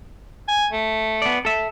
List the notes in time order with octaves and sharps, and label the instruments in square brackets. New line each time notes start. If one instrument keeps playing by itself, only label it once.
[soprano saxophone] G#5
A3
[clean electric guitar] B3 D5
A4 E5